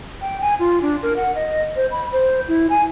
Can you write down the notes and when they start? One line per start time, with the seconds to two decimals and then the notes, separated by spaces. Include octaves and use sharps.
0.22 G5
0.41 G#5
0.59 F4
0.82 D4
1.03 A#4
1.16 F#5
1.35 D#5
1.76 C5
1.91 B5
2.12 C5
2.48 E4
2.70 G#5